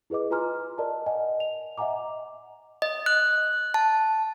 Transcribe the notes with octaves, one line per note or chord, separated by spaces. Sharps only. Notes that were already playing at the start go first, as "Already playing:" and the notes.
E4 G#4 B4 D#5 D6
F4 B4 G#5 A#5 C6 F6
A#4 D5 D#5 A5
D#5 F#5 G#5
F7
D#5 E5 F#5 G#5 A#5 D6
D#5
F#6
A5